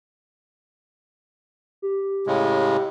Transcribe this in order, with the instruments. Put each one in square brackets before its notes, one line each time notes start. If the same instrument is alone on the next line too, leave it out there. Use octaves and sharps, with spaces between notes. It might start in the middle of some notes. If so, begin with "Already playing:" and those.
[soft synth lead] G4
[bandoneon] A2 C#3 G#3